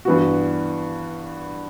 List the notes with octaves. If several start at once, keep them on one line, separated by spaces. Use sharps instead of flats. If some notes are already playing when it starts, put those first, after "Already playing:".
G2 E3 B3 F#4